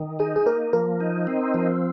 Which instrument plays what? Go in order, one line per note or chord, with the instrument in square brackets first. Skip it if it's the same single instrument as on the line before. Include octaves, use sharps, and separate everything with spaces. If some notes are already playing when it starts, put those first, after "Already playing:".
Already playing: [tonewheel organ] D#3
[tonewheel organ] D#4 [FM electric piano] G#4
[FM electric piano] G#4
[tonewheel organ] A#3 [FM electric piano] A#4
[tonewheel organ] F3 [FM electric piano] A#4
[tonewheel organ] D#4
C4
F3